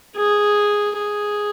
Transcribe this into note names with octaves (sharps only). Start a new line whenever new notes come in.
G#4
G#4